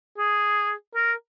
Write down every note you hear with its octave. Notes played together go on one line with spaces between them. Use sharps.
G#4
A#4